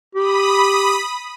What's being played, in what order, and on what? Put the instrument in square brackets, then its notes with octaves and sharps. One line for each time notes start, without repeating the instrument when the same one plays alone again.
[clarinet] G4 [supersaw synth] B5 D#6